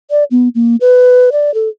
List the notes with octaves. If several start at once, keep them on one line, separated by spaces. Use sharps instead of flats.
D5
B3
A#3
B4
D5
A4